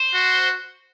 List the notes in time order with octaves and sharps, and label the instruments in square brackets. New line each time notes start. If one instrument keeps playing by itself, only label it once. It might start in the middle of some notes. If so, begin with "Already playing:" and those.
Already playing: [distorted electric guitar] C5
[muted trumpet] F#4